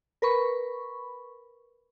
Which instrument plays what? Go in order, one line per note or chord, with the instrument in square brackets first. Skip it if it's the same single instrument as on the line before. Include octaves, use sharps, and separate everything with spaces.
[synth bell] A#4 B4 B5 C#6